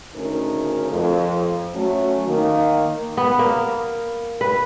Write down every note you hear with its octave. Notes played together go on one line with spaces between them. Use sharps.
D2 C#3 A3 C#4 D#4 A#4
F2
F#3 A3 C#4
D#3 A#3
B3
A#3
B4